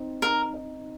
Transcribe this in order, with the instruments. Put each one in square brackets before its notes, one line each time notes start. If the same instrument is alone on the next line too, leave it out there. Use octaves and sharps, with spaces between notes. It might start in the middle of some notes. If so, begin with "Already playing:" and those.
Already playing: [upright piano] C4 D#4
[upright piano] D#4 [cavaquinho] A#4
[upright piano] D#4